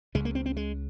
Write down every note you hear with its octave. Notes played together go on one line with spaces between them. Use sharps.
C#2 C#3 G#3
A#3
C4
C4
G#3